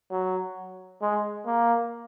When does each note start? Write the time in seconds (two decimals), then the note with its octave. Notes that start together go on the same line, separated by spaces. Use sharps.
0.11 F#3
1.02 G#3
1.46 A#3